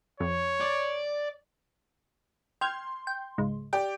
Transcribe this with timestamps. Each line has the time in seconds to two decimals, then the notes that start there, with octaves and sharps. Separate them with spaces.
0.20 F2 C#5
0.60 D5
2.61 G5 C6 F6 G#6
3.07 G5
3.38 C#2 G#2
3.73 G4 D5 G5